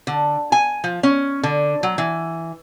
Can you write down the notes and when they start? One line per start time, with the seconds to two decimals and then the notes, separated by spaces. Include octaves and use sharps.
0.07 D3
0.52 G#5
0.84 F3
1.03 C#4
1.43 D3
1.83 F#3
1.98 E3